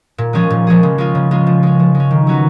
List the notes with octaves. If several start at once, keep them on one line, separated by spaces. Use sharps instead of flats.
A#2
F3 G#3 C#4 G#4
A#2
F3 G#3 C#4 G#4
C#3
G#3 C#4 F4
C#3
G#3 C#4 F4
F3
G#3 C#4
F3
G#3
C#4
D#3
F#3 C#4 F#4 B4